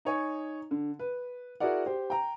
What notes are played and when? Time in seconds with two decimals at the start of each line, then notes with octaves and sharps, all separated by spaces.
0.05 D#4 C#5 G#5
0.71 D3
0.99 B4
1.60 E4 F#4 G#4 A#4 D5 F#5
1.86 G4 C5
2.10 G5 A#5